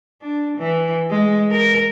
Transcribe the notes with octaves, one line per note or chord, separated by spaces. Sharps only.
D4
E3
G#3
A#4